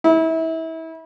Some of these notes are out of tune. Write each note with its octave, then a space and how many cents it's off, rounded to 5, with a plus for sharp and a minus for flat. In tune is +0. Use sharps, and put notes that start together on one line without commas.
E4 -30